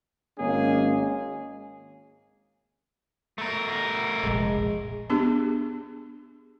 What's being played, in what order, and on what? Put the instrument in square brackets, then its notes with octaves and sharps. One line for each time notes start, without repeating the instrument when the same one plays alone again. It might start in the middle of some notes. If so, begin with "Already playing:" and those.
[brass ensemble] G#1 G#3 A#3 C#4 G#4
[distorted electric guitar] A3 A#4
[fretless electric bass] F1 A#1 [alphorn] G#3
[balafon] B3 D4 G4 G#4